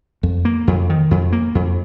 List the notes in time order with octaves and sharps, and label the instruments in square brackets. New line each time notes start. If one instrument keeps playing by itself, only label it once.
[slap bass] F2
A#3
F2
D#3
F2
A#3
F2